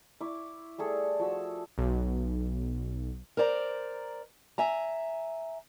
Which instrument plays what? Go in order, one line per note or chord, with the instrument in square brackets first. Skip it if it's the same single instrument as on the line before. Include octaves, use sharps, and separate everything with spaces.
[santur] E4 C#6 D6
G3 A3 G#4 A4
F3 F#4 E6
[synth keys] B1
[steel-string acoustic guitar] A#4 C5 D5 A#5
E5 G#5 A#5